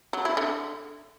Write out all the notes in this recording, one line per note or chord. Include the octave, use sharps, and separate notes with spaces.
F#3
E4
D3